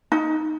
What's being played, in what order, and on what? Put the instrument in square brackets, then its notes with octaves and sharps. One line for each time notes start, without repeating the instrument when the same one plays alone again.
[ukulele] D#4